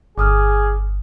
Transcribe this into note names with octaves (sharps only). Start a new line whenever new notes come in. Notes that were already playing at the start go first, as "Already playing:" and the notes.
G1 G#4 D6 D#6 F6